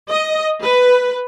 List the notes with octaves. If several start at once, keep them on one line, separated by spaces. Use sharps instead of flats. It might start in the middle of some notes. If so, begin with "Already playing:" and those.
D#5
B4